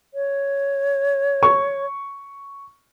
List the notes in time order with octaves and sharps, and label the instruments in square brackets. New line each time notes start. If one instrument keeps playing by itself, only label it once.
[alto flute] C#5
[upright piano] C#6